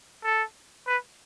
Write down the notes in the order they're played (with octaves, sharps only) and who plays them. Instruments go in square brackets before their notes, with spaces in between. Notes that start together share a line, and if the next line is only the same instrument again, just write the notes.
[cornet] A4
B4